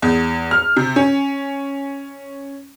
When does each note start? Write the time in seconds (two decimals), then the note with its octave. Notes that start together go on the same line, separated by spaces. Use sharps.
0.02 E2
0.51 F6
0.77 C3
0.96 C#4